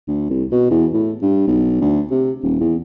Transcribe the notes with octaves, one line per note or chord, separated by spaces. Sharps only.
D2
C2
B2
E2
A2
G2
B1
D2
C3
D#1
E2